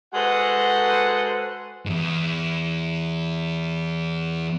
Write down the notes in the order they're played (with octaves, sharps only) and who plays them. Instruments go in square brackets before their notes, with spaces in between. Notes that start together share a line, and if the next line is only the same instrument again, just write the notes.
[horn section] G#3 F#4 A4 B4 C5 F#5
[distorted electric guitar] E2 G#2